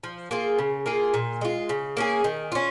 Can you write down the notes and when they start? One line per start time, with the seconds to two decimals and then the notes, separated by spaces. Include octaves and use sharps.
0.04 F3
0.31 A#3 F4 G#4
0.59 C#3
0.86 A#3 F4 G#4
1.14 A#2
1.41 G#3 F4
1.69 C#3
1.97 A#3 C#4 G#4
2.24 D#3
2.52 C#4 F4